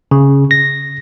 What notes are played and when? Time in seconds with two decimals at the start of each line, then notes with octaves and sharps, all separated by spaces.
0.11 C#3
0.51 A#6